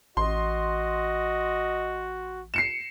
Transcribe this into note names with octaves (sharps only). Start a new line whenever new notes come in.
A1 F#4 D#5 C6
C7 C#7 E7